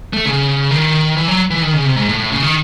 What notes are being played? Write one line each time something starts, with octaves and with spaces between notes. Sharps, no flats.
A3
C#3
D#3
E3
F#3
E3
D#3
C#3
C3
G#2
A2
A2
C#3
D#3